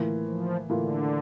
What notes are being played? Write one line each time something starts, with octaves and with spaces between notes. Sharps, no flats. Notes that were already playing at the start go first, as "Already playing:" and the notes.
Already playing: A2 E3 A#3 F4
F3
A2 D3 E3 A#3 F4